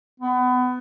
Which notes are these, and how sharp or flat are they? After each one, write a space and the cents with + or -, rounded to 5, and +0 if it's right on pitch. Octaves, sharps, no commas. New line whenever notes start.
B3 +25